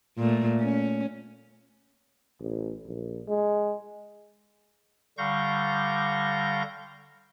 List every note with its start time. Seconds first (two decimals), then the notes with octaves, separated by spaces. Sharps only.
0.18 A#2 A3
0.60 C#4
2.40 A1
2.86 A#1
3.28 G#3
5.18 D3 G3 F5 C#6 G6 A#6